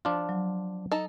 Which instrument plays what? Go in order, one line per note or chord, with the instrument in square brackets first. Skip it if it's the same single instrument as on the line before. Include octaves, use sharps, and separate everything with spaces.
[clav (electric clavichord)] F3 D4 F4
[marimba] F#3
[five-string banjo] D#4 A4 A5